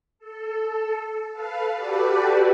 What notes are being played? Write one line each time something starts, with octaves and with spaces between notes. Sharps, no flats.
A4
A4 B4 F5
F#4 G4 A4 B4 D5